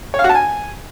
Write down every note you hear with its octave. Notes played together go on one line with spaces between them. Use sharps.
C#5
F5
F#4
A5
G#5